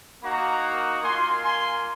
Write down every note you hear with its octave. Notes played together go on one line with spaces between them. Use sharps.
A#3 D#4 F#4 F#5 A#5
A#3 F4 G#5 C6
G#5 C6